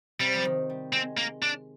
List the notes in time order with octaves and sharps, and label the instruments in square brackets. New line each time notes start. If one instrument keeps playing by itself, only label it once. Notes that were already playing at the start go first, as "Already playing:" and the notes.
[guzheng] C3 [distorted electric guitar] G3
[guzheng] F3
D#3
G3
[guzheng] G#3 [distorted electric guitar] C4
[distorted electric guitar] A#3
D4